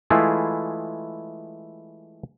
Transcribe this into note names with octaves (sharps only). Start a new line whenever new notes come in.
E3 G#3 A3 E4 F4 G#4